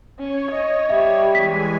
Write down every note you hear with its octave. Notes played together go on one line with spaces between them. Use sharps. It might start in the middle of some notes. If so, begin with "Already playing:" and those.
C#4 C#5
D#5
G3 E5
E3 G#3 G#5 B6